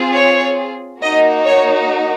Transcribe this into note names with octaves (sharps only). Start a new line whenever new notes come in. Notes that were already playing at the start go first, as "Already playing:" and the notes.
Already playing: C4 F4 G#4
C#5
A#3 D#4 F#4 D#5
C#5